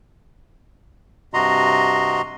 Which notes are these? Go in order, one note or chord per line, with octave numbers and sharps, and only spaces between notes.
G2 C3 F#4 D#5 A#5 C6